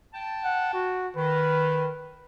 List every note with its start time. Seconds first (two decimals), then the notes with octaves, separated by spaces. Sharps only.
0.14 G5 A5
0.44 F#5
0.74 F#4
1.17 D#3 B4